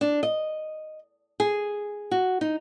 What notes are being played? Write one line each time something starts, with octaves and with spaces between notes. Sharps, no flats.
D4
D#5
G#4
F#4
D#4